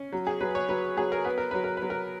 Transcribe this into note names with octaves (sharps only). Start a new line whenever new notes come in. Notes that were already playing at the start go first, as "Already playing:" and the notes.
Already playing: C#4
F#3
G#4
F#3 B4
C#5
F#3 B4
F#3 G#4
A#4
B3 B4
A#4
F#3 B4
A#4
B4
F#3
A#4